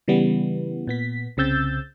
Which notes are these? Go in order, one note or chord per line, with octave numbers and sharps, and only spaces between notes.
C#3 E3 G3 B3
A#2 B3 B6
C2 C#3 C4 E6 G6 A6